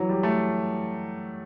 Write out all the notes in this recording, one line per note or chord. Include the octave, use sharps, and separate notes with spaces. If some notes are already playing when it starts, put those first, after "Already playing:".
Already playing: E3 F#3
G3
A3